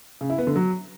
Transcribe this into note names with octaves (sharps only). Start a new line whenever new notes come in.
C#3
E4
B3
D3
F#3